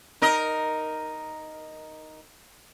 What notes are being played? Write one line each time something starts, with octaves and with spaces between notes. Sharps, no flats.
D#4 A#4 D#5